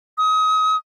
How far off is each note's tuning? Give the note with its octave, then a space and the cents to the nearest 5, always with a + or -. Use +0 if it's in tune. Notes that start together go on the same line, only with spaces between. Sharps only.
D#6 +30